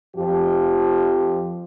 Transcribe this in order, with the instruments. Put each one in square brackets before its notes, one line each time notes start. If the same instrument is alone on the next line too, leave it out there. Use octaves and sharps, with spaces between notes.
[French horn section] F2 F3 G4